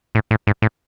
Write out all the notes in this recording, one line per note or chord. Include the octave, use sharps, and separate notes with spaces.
A2
A2
G#2
A2